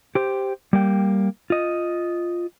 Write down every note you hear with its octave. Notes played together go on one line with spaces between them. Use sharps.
G4 C5
G3 A#3 G5
F4 D#5